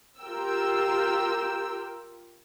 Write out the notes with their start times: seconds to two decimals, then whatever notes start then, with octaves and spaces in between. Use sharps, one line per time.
0.21 F4 G4 A#4 G5 E6